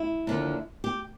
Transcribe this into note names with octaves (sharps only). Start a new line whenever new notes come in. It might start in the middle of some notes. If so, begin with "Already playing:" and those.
Already playing: E4
D#2 D3 F3
G4